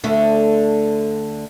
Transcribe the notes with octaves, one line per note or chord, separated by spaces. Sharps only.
D2 D3 A3